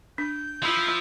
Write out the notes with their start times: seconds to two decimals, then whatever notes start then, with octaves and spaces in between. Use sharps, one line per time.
0.18 D4 G6
0.62 F3 E4 E5